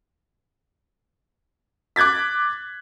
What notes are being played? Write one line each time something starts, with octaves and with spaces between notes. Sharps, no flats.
D6 F#6 G#6 A6 B6